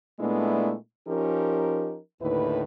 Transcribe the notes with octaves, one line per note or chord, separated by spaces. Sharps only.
A#2 G#3 A3 B3 D4 E4
F3 C#4 D#4 G4 A#4
D#2 A2 D3 E4 B4